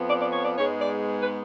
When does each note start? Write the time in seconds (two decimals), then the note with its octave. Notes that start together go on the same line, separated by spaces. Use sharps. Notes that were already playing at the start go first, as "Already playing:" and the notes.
Already playing: F2 F3 B3
0.09 D5
0.21 D5
0.33 C#5
0.45 D5
0.57 G#2 G#3 B3 C#5
0.81 D5
1.21 B4